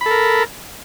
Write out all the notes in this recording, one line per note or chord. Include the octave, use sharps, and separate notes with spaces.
A4 A#4 B5